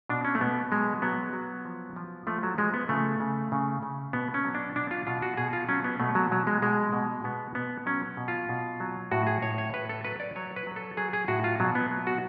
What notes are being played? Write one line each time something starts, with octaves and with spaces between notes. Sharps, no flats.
B2 D4
C#4
A3
B2 B3
F#3 G#3
F#3 B3
F#3
F3
F3
F3 A3
F#3
F3 G#3
B3
C#3 A3
C#3
C#3
C#3
B2 B3
C#4
F#3
D4
B2 D4
F4
B2 F4
F#4
B2 G#4
F4
F#3 C#4
B3
B2 A3
F#3
B2 F#3
G#3
B2 G#3
B2
B2 B3
B2 B3
F#3 C#4
B2
F4
B2
F#3
A2 F#4
G#4
A2 C#5
C#5
A2 B4
A4
F#3 B4
D5
F#3 C#5
B4
F#3
A4
F#3 G#4
G#4
A2 F#4
F4
B2 F#3
B3
F#3
F#4